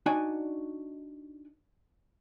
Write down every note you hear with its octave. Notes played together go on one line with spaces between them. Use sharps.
D4 D#4 F#4 D5 F#5 G#5